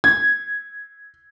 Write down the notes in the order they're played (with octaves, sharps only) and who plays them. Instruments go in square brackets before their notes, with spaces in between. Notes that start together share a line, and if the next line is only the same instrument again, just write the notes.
[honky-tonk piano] G#6